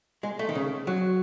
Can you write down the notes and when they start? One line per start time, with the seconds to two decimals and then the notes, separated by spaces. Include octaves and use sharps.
0.23 G#3
0.39 A3
0.49 D#3
0.55 C#3
0.87 F#3